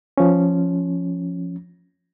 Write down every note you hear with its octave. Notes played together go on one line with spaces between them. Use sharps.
F3 C#4